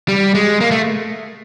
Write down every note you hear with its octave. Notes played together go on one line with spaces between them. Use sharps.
G3
G#3
A#3
A3